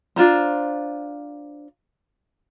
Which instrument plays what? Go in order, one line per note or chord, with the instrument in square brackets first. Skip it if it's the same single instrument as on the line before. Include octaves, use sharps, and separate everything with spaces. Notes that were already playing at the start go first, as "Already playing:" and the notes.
[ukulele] D4 F4 C5 A#5